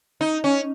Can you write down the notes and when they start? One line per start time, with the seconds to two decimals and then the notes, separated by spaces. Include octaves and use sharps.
0.21 D#4
0.44 C#4